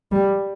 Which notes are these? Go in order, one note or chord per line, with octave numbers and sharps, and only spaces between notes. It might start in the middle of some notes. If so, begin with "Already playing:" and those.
G3